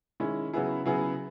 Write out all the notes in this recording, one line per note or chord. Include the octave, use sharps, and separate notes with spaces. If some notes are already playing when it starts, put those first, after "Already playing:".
D#3 G#3 C#4 E4
C#3 F#3 B3 E4 G#4
C#3 F#3 B3 E4 G#4